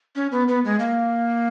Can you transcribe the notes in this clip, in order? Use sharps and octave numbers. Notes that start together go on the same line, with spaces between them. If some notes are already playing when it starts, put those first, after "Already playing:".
C#4
B3
B3
G#3
A#3